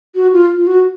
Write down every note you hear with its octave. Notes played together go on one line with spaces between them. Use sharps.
F#4
F4
F4
F#4